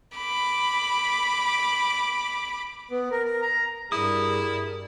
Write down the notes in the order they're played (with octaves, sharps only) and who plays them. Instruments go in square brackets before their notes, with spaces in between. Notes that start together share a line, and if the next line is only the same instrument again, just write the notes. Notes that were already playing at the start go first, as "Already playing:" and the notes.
[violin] B5 D6
[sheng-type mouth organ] B3
A#4
A#4
A#5
[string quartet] G2 A#4 D5 [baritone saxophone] E4 [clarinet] G#4 [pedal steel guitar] D#6